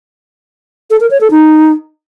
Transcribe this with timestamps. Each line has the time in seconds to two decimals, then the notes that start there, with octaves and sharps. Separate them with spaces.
0.90 A4
1.00 A#4
1.11 C#5
1.21 A4
1.31 D#4